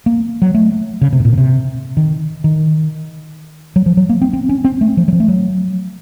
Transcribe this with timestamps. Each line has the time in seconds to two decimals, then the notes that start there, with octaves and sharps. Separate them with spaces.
0.06 A#3
0.42 F#3
0.55 A3
1.01 C#3
1.13 C3
1.20 A2
1.25 A#2
1.33 C#3
1.38 C3
1.97 D#3
2.44 D#3
3.76 F#3
3.86 F3
3.97 F#3
4.09 A#3
4.22 C4
4.33 C4
4.49 C#4
4.65 C4
4.81 A3
4.97 F3
5.08 F#3
5.13 F3
5.20 A3
5.28 F#3